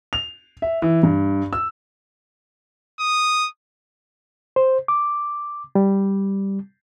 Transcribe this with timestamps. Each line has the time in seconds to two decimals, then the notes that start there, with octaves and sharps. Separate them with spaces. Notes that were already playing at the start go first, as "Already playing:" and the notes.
0.13 F7
0.62 E5
0.82 E3
1.03 G2
1.53 E6
3.00 D#6
4.56 C5
4.88 D6
5.75 G3